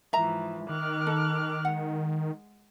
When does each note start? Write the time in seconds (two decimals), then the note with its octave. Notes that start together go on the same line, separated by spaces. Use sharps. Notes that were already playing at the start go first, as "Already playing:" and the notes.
0.13 G#2 E3 F3 E5 A#5
0.69 D#3 D6 F6 F#6
1.07 D#4 A4
1.65 G#3 F#5